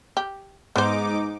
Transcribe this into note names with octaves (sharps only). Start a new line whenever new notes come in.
G4
G#2 B3 D#4 C5 D6